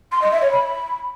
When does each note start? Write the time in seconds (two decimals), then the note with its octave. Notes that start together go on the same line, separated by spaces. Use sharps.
0.12 C6
0.22 D#5
0.32 E5
0.42 C#5
0.51 B5